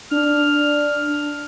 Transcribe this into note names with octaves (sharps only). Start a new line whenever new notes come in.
D4 F6